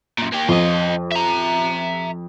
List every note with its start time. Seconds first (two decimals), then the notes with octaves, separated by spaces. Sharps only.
0.18 F#2 A#2
0.32 A#3 G4
0.48 F2 F4 D#5
1.12 E5 A#5